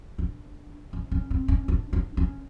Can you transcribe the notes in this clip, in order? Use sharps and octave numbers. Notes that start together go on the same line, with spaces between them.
D4
C#4
C#4
C4
C#4
D4
D4
C#4